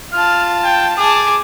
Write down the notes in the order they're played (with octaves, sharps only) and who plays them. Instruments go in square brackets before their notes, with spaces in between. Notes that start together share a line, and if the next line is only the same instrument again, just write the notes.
[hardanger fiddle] F4 A5 [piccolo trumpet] F6
[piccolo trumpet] G5
[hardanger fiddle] G#4 A5 [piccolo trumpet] D6